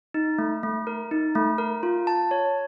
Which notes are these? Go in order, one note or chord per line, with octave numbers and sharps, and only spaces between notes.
D#4
A3
A3
A#4
D#4
A3
A#4
F4
A5
C#5